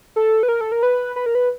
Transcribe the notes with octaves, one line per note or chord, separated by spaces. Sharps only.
A4
B4
A#4
A4
A#4
B4
B4
A#4
B4